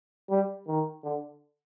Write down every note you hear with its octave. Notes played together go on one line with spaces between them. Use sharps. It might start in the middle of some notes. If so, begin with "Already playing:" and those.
G3
D#3
D3